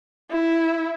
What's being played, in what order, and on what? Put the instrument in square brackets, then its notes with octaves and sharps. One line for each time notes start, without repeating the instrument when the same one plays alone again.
[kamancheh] E4